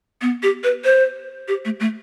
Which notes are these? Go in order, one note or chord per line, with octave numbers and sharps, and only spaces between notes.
B3
G4
B4
C5
G4
A3
A3